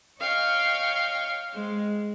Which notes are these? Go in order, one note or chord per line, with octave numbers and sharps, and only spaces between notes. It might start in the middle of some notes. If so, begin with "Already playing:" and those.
C#5 D#5 F5 G5 C#6
G#3 C4